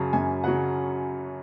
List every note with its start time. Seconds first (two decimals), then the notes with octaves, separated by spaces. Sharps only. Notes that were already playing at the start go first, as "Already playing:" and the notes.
Already playing: F#2 C#3 F#3 A5
0.13 F#2 G#5
0.44 C#3 F#3 F#5